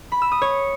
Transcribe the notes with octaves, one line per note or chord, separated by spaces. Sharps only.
B5
E6
D#6
C#5